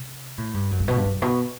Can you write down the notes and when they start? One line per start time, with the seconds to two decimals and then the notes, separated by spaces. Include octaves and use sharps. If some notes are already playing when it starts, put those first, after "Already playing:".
Already playing: C3
0.38 A2
0.54 G2
0.71 F#2
0.80 G2
0.88 B2
0.96 G2
1.05 F#2
1.22 B2